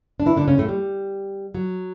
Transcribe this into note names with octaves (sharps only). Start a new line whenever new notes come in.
D4
E3 E4
D3 D4
C#3 C#4
A2 A3
G3
F#3